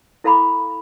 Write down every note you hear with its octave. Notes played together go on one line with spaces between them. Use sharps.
E4 A4 F5 A#5 B5 D6